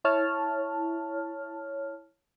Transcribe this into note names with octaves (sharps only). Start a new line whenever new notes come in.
E4 C#5 A5 F6